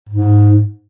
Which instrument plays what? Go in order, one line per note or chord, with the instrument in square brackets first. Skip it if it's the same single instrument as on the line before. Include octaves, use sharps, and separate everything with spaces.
[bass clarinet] G#2